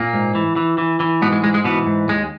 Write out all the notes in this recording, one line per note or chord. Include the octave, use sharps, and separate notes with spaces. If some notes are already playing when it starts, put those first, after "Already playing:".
Already playing: A#2 A#3
G#2
E3
E3
E3
E3
G#2 B2 B3
G#3
G#2 G#3
G#3
B2 E3 B3
G#2
D#2 G#3